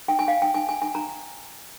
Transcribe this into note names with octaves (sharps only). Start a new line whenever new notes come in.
G5
G#5
F5
G5
G#5
G#5
G#5
A#5